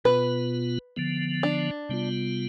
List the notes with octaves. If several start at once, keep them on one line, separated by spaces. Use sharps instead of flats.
B2 B3 F4 B4
D3 F3 B3
D4
C3 G3 B3 F4